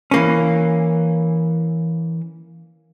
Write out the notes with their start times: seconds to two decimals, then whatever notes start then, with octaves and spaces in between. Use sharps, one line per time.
0.11 E3 A#3 C#4